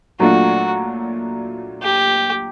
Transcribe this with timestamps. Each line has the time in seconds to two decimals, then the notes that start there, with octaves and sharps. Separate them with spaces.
0.19 A#2 F#3 A3 D4 F4 F#4
1.82 G4